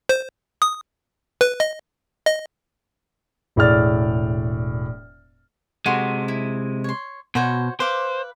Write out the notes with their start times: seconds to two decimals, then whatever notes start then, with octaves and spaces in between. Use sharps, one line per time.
0.09 C5
0.62 D#6
1.41 B4
1.60 D#5
2.26 D#5
3.56 E1 A2 G#4 D5 F6 A6
5.86 C3 G#3 F#4 A4 C6
6.28 E4
6.84 C#5 C6
7.35 B2 F#4 C5 C#5
7.80 B4 C5 F5 D6